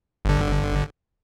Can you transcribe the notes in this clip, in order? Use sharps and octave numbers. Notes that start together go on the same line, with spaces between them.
G1 D3